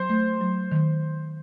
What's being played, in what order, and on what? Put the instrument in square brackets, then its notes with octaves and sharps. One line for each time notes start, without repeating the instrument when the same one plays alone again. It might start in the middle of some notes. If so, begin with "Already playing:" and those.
Already playing: [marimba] F#3 [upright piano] C5
[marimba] A3
F#3
D#3